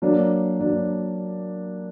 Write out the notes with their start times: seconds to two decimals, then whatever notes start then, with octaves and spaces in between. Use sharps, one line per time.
0.02 F#3 A#3 D4
0.60 F#3 A#3 D4